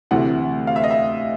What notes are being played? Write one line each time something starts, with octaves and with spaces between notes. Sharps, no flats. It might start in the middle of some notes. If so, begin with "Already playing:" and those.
D2 C3 E3 F#5
F5
E5
D#5
E5